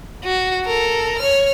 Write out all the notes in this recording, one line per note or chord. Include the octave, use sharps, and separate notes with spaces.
F#4
A4 A#4
C#5 F6